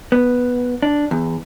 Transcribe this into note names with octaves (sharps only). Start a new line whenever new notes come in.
B3
D4
E2